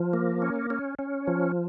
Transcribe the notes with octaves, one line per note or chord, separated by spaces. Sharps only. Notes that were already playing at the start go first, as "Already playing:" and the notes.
Already playing: F3
A#3
C#4
C#4
C#4
F3